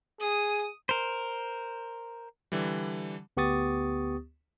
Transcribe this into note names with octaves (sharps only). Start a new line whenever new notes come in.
G#4 D#6
A#4 C5
D3 E3 G3
D2 B3 G4 C#6 D#6 A6